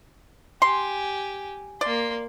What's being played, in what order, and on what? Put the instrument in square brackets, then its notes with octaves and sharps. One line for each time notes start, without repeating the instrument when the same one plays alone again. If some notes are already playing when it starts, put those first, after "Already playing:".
[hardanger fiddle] G4 G#5 [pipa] C6
[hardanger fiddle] A#3 C6 [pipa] D5